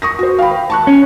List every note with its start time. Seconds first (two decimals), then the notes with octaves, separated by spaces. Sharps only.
0.02 C#6 D#6 A#6
0.19 F#4 C5
0.39 F5 G5 B5
0.70 A5 C#6 F#6
0.87 C#4